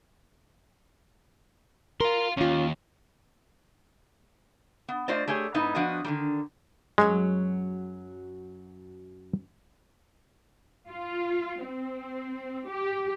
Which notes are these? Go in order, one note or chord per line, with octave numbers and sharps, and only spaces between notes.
A#4 F5 C6
D#2 C#4 F4
B3
A3 F4 C5 D5 D#5
A3 G4 G#4 C#5
G#2 B3 D#4 E4
F3 B3 D4 F#4 D#5
D3 D#3 G3
F#2 F#3 G#3 C#5
F4
C4
G4